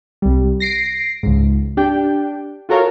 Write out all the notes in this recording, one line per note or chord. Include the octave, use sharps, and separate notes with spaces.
C2 G3
A#6 C7 D7
C#2 G#2
D4 G4 G5
F4 F#4 A4 A#4 C#5 F5